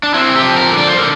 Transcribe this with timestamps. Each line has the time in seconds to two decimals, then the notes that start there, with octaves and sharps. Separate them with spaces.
0.03 D4
0.14 C4 E4
0.36 G4
0.42 F3
0.56 A#4
0.70 D3
0.78 D5
0.88 C5
0.97 D3 A#4